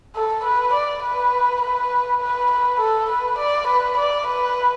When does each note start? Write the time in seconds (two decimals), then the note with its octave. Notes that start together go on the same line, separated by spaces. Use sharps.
0.16 A4
0.44 B4
0.73 D5
1.03 B4
1.62 B4
2.21 B4
2.51 B4
2.80 A4
3.10 B4
3.39 D5
3.67 B4
3.97 D5
4.27 B4